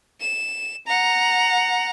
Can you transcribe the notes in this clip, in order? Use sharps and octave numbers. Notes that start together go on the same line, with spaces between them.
E7
F#5 A#5